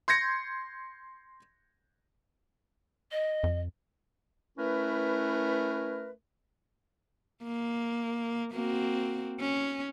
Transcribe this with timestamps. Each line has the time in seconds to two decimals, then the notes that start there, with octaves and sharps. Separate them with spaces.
0.08 C6 G6 G#6 A#6 C#7
3.11 D#5
3.44 F2
4.58 A3 C#4 E4 A#4 B4
7.43 A#3
8.54 A#3 C4 F#4
9.40 C#4